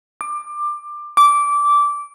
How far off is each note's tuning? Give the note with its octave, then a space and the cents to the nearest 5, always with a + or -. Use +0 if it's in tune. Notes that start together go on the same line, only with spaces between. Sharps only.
D6 +20
D6 -15